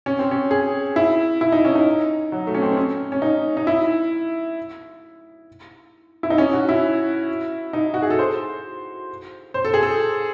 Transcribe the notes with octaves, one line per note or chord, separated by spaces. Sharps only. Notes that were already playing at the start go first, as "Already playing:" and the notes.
C#4
C4
C#4
G#4
E4
E4
D#4
C#4
D#4
F#3
A3
C#4
C4
C4
C#4
C#4
D#4
D#4
E4
E4
D#4
C#4
F#4
E4
D#4
F#4
G#4
A4
C5
C5
A4
G#4
A4